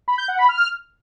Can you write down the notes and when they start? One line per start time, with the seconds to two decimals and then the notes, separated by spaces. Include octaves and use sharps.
0.08 B5
0.18 G6
0.28 F#5
0.38 B5
0.49 F6